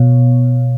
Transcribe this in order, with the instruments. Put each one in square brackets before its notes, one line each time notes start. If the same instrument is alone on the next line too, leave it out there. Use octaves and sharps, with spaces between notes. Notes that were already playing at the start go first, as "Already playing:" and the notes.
Already playing: [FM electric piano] B2 C#5 F5